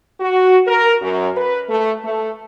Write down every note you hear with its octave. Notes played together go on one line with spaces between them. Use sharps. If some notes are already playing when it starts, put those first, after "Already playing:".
F#4
A#4
F#2
B4
A3
A3